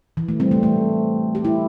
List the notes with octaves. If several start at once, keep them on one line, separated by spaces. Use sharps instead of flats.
E3
A3
G3 C4
A3
A3
G4
E4